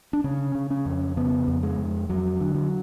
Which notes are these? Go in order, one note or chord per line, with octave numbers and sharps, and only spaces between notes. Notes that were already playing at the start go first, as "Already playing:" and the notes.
D4
C#3 C#4
C#3
C#4
F2
C#3 B3
F2
G#3
F2
F2 F#3
D3
F#3